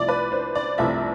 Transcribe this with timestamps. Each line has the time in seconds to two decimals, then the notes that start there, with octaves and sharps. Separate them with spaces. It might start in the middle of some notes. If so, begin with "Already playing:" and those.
Already playing: C2 C3 F3 A3 E4 D5
0.08 B4
0.32 C5
0.55 D5
0.78 C2 C3 F3 A3 E4 E5